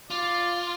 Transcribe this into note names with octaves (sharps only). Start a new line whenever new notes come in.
F4 D5